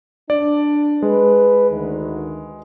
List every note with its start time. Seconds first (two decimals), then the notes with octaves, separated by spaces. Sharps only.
0.30 D4 D5
1.02 G#3 B4
1.70 D2 D#3